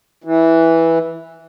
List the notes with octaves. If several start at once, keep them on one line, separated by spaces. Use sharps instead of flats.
E3